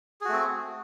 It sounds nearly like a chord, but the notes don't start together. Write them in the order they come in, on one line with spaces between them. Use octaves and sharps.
G#4 F#4 A3 C4